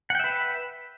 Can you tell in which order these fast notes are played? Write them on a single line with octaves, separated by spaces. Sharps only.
F#5 G5 E5 B4